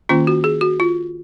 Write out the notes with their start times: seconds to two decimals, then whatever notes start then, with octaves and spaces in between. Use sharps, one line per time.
0.09 D#3 A#3 C#4 F4
0.27 F#4
0.44 G#4
0.61 F#4
0.80 F4